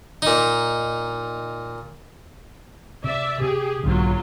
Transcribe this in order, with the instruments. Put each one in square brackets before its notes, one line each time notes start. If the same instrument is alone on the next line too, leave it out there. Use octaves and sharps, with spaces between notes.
[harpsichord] A#2 D#4
[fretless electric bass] C3 [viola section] D5 E5
[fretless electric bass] C3 [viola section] G4 G#4
[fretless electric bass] B1 G#2 D3 [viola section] F#3 A#3 F4